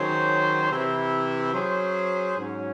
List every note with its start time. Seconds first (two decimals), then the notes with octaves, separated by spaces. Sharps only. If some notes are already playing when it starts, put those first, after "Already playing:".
Already playing: D#3 F#3 C#4 G#4 C5
0.71 C3 E3 C4 E4
1.53 F#3 C#4 G#4 C5
2.37 G#2 F#3 C#4